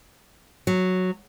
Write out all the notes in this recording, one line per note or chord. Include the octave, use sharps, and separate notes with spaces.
F#3